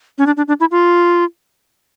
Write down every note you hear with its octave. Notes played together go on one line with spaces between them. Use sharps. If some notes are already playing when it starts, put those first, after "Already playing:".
C#4
D4
D4
D4
E4
F4